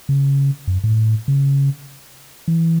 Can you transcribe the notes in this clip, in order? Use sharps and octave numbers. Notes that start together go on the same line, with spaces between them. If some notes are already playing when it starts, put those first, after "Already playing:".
C#3
F#2
A2
C#3
E3